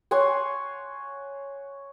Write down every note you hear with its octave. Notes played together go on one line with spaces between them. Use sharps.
C#5 F#5 G#5 C6